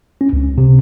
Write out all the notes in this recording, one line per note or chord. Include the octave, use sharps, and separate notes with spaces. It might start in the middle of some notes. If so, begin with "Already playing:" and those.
C#4
C#2
C3